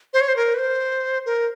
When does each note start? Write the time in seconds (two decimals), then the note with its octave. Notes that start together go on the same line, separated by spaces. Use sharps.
0.13 C5
0.21 C#5
0.28 C5
0.36 A#4
0.54 B4
0.58 C5
1.26 A#4